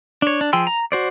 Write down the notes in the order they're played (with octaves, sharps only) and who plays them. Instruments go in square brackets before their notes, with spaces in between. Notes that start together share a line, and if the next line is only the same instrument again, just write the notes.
[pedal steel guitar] D4 C#5
D4
F3 G#4 G5 C6 E6
A#5
F#4 C5 D5